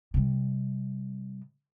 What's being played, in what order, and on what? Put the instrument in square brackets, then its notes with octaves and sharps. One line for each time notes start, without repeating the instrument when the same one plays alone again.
[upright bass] C3 G3